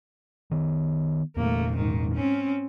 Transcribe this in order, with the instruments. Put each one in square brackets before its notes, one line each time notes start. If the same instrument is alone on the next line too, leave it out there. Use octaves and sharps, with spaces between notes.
[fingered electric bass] D#3 B3
[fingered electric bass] E2 A#2 [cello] A3 A#3
[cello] G#2 D#3
C4 C#4